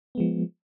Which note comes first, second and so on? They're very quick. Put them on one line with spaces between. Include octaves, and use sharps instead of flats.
B3 G#3 F3